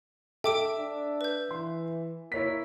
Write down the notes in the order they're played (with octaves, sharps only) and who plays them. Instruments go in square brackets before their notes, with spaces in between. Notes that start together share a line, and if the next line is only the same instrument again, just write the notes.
[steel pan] A4 [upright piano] E5 [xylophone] G5 D6 D7
[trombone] D4
[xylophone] B4 G6
[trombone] E3 [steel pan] C6
[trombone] A#3 [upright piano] E4 C#5 B6